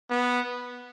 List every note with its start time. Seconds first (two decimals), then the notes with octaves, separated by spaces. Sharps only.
0.10 B3